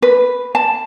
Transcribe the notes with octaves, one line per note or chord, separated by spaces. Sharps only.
B4
A5